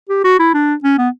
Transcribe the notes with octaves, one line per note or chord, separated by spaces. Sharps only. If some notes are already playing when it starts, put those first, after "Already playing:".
G4
F#4
E4
D4
C#4
B3